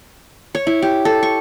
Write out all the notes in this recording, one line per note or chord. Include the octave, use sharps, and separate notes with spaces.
C#5
E4
G4
A4
C#6